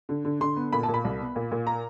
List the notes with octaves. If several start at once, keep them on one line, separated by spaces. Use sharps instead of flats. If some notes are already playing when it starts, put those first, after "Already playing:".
D3
D3
D3 C6
B3
A#2 B5
A5
A#2
B5
C2
B3
A#2
A#2
A#5